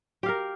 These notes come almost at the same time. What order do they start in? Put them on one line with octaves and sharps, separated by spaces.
G4 F5 A#4